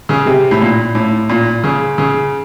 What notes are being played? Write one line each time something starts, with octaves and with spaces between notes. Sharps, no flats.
C#3
C3
A2
A#2
A2
A#2
C#3
C#3